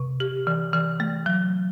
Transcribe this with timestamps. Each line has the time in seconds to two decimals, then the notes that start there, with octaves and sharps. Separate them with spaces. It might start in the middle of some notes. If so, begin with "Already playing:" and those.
Already playing: C3
0.20 G4
0.47 E3
0.73 E3
1.00 A3
1.26 F#3